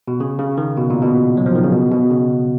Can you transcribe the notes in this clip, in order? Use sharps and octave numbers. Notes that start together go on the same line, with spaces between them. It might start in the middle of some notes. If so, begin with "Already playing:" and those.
B2
C#3
C#3
D#3
B2
A#2
B2
F#3
F3
D#3
C#3
B2
B2
C#3